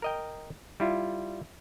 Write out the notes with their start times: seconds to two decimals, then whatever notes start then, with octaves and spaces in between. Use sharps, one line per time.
0.02 A#4 D#5 G5
0.80 G3 E4 F4